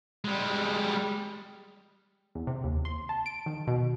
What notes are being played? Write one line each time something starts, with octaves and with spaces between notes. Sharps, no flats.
G3 G#3
E2
C3
D#2
C6
A5
D7
D#3
B2